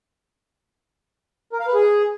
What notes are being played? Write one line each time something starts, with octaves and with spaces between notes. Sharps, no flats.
A#4
F5
B4
G#4